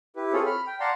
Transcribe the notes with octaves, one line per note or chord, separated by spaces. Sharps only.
E4 G4 B4
C4 F4 G#4 A4 C#5
B5 F6
G5
D5 F5 F#5 A5 A#5 C6